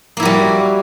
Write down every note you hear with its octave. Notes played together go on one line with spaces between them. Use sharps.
G3 A#3 E4 F#4